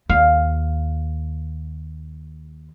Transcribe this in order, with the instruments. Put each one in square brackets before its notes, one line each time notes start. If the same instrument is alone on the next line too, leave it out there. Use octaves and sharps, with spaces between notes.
[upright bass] D#2 [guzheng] F5